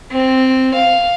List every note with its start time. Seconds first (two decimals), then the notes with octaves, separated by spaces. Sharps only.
0.12 C4
0.75 F5